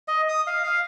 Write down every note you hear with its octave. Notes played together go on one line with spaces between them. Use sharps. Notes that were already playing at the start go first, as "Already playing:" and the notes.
D#5
D#6
F5
F5